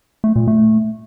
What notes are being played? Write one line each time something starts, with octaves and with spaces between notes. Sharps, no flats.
A3
A#2
A3